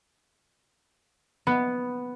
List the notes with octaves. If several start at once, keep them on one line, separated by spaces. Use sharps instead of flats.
B3